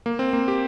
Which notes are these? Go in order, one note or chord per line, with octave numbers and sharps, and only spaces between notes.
A#3
C4
A#3
G4